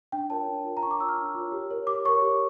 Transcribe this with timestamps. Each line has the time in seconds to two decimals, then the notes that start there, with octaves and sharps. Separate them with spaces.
0.12 D4 G5
0.30 F4 A#4 C#5 A5
0.48 D4
0.65 F4 A#4 C#5
0.77 A#5
0.83 D4 C#6
0.91 D6
1.00 F4 A#4 C#5 E6
1.09 F6
1.18 D4
1.34 F4 A#4 C#5
1.52 G4
1.71 A#4 C#5
1.87 G4 D6
2.05 A#4 C#5 C#6
2.22 G4